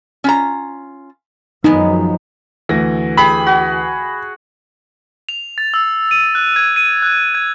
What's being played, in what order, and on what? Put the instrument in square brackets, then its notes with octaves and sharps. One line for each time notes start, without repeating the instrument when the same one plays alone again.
[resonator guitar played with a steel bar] C#4 F4 A#5
[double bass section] F#2 F3 F#3 [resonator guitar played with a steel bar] G#3 B3 [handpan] D#4
[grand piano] D2 E3 A#6
[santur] G4 G#4 [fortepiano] B5
[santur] F#4
[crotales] F7
A6
E6
D#7
F#6
G#6
D#7
F#6
G#6